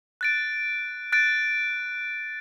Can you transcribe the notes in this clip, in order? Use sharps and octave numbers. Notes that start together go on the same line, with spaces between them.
F#6 A6 D7
F#6 A6 D7